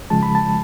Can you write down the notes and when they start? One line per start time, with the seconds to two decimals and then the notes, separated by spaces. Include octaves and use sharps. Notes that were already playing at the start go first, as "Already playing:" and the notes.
0.10 C#3 F3 G#3 A5
0.23 B5
0.35 A5